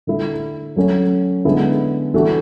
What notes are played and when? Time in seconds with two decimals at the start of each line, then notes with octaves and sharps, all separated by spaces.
0.07 D3 A3 E4
0.76 F#3 A3 C#4
1.45 D3 G#3 B3 E4
2.14 E3 A3 D4 F#4